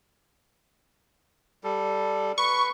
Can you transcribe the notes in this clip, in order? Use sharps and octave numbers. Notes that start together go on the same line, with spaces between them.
G3 A4
B4 C#6